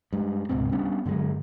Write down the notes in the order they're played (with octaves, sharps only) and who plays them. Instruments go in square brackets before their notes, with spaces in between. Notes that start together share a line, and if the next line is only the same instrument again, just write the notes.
[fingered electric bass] G2 G#3
C#2 G#2 B2 C4
G3 B3 C#4 D4
G2 D3 F#3 G#3